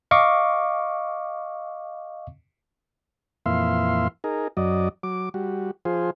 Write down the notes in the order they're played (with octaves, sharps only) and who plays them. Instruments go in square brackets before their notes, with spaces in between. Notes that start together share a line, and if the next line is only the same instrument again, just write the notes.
[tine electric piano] D#5 F5 C#6 D6
[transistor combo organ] F2 A#2 E3 E5 F5 C6
D#4 G#4 A#4
F#2 F#3 D5 D#5
F#3 D6
G3 F#4
F3 F4 G#4 C5